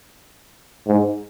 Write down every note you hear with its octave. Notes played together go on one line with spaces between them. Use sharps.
G#2